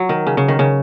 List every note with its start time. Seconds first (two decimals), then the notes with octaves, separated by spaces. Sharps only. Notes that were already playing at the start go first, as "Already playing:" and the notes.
Already playing: F#3
0.09 D#3
0.27 C#3
0.37 C#3
0.48 D#3
0.59 C#3